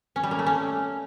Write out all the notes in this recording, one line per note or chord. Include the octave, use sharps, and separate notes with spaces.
C#4
G3
A#3
A3
C#4